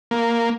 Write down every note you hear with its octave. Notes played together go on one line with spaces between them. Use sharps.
A#3